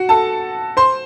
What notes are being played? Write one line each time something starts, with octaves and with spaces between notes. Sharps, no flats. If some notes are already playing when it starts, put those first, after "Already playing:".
Already playing: F#4 F#5
A4 A5
C5 C6